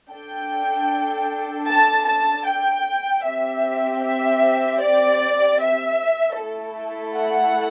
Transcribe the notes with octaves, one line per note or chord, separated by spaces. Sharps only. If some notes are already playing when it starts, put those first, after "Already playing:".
D4 A4 G5
A5
A5
G5
C4 G4 E5
E5
D5
E5
A3 E4 A4
F#5